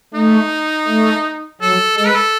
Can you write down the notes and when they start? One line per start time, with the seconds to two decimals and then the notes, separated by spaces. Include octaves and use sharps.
0.14 A3 D#4
0.87 A3
1.61 F#3 A4
1.97 G#3 A4
2.07 B4
2.15 A4